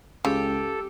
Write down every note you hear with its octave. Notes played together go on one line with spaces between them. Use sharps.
C#2 C#3 G4 A4